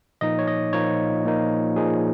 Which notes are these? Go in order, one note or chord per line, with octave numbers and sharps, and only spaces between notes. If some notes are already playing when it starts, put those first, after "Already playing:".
A#2 F3 A#3 D#4 D#5
C#5
D#5
A#2 F3 A#3 D#4 C#5
A#2 F3 A#3 D#4
A#2 F3 A#3 D#4 G#4